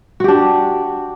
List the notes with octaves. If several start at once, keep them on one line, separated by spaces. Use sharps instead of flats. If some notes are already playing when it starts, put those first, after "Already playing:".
D4 F#4 G4